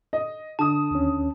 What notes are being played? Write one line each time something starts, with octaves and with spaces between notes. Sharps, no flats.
D#5
D3 A5 D#6
D#2 C#4